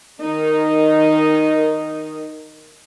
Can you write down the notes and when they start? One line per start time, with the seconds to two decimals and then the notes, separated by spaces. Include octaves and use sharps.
0.24 D#3 D#4